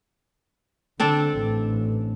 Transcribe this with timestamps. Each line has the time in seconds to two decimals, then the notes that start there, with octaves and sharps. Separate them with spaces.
1.00 D3 C4 D4 A4
1.38 A1